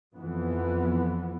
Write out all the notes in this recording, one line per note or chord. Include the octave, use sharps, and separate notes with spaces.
F2 E3 B3